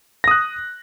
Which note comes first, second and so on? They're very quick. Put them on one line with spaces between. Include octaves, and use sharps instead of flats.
A#6 D#6 F#6